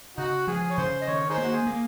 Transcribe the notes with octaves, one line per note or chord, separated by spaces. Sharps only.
C#3 D#4 F#4
F3 G#4
C#5
C#3 C5
D#5
D#3 C#5
D#4 G#4 C5
A#3
F#4
G#4
A#3